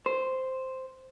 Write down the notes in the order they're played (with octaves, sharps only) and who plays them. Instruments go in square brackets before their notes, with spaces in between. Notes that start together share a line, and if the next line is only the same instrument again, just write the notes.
[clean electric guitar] C5